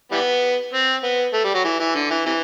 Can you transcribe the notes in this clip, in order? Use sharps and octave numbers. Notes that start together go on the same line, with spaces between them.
E3 G3 B3
C4
B3
A3
G3
F#3
E3
E3
D3
E3
C3 E3